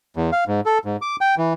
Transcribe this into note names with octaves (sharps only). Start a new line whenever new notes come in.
E2
F5
G#2
A4
G#2
D6
G5
E3